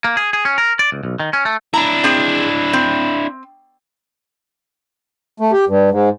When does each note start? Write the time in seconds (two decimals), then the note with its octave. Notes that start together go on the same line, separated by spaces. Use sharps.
0.05 A#3
0.17 G#4
0.33 G#4
0.45 C#4
0.58 A#4
0.79 D5
0.92 C#2
1.03 B1
1.20 D#3
1.33 C#4
1.45 A3
1.74 D4 E4 A#5
2.04 C4 G#4
2.73 C4
5.40 A3
5.52 G4
5.68 G2
5.91 G#2